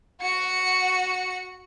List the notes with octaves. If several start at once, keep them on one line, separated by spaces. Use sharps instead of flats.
F#4 C#7